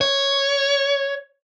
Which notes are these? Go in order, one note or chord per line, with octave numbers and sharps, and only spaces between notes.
C#5